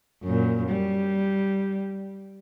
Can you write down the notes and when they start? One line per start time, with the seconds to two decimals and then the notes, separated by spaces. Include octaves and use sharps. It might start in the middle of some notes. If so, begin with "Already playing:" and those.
0.23 F#2 A#2
0.69 G3